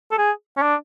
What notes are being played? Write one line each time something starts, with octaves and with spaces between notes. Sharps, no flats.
A4
G#4
C#4
D4